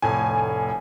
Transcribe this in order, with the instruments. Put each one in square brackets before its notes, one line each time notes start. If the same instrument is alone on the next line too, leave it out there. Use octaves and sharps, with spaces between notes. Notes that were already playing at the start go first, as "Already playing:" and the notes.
[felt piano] F1 A2 [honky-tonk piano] G#5